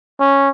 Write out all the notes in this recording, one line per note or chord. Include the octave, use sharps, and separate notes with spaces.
C#4